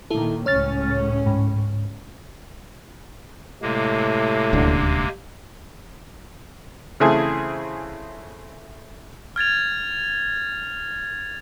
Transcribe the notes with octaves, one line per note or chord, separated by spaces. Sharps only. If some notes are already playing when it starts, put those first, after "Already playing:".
A#2 D#3 A#3 E4 A4
C#2 A2 C#4 C#5 F6 A6
G#2
A2 C3 G#3 A#3
D#1 D2 D3
C#3 E3 A3 C4 E4 G#4
F6 G#6 A6 F7